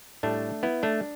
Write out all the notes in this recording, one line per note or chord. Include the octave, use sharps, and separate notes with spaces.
A2 G3 A3 D4
B3 E4
A3 D4